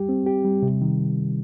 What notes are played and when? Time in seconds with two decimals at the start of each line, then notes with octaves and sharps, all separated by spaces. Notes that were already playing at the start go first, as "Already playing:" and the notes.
Already playing: G3 G4
0.09 C4
0.26 G4
0.45 G3
0.62 C3
0.82 D#3